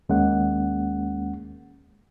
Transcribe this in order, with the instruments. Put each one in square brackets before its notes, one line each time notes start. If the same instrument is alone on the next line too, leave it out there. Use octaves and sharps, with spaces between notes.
[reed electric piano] D#2 G#3 A#3 C#4 F#5